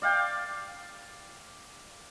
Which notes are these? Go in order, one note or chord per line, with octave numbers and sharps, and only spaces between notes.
D5 F5 G5